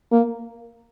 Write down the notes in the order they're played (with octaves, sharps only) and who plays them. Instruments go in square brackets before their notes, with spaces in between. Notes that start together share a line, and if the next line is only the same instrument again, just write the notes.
[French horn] A#3